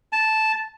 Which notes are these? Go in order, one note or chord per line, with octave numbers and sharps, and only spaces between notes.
A5